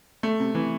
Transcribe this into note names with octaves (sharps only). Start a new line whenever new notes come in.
A3
C3
E3